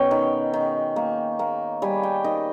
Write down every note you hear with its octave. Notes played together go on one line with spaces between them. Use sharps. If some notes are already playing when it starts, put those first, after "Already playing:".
Already playing: B2 C#4 C#5 G5
D#3
D#3
A#3
A#3
G3 G#5
G5
D#3 D#5